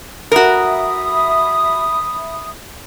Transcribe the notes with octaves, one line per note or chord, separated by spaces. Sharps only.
F#4 A#4 E5 B5 D#6